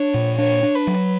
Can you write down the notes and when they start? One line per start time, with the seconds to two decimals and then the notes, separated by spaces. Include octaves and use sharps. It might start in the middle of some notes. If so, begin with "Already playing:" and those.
Already playing: D4 C#5
0.14 A#2
0.38 D4 C#5
0.63 D4
0.75 B4
0.87 F#3